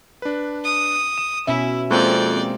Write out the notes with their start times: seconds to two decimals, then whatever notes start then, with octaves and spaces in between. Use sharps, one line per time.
0.22 D4 B4
0.64 D#6
1.18 E7
1.47 B2 C#4 E4 E5
1.91 F2 G#3 A#3 C4 D5 G5